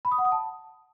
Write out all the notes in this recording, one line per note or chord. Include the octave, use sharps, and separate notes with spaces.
B5
D#6
F#5
D#6
A5